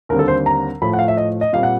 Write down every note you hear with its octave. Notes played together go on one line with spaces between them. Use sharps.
D#2 D3 G3 C4 A#4
A4
C5
A#5
A2 F3 A3 B5
F#5
F5
E5
D#5
D#5
A#2 G3 C4 F5
F#5